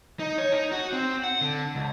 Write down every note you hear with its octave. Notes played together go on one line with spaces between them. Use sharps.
D#4
C#5
D#4
F#4
C4
F#5
D3
C#2